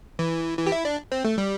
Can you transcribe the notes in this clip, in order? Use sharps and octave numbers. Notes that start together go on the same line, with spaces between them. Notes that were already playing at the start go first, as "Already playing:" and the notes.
E3
E3
G4
E4
D4
C4
A3
G3